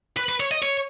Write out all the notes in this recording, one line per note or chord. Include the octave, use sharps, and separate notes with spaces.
B4
B4
C#5
D#5
C#5